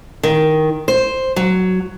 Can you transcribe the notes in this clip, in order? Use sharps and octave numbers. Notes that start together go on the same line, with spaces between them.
D#3
C5
F#3